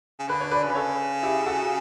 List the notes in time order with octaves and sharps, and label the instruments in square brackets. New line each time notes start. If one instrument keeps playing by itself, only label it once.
[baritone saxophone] C#3
[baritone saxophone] D3 [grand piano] B4
[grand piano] C#5
B4 D5
[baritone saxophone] C#3
[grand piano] B4
A4 C#5
E4 G4
F#4 A4